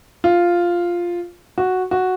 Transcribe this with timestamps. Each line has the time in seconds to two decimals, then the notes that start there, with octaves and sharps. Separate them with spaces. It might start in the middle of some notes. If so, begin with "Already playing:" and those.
0.24 F4
1.58 F#4
1.91 F#4